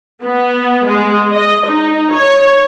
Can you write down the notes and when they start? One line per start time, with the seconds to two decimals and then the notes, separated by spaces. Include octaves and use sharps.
0.24 B3
0.87 G#3
1.33 D#5
1.67 D#4
2.13 C#5